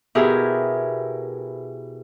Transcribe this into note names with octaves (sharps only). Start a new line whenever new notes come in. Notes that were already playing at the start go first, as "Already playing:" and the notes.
B2 E4 G4 G#4 A#4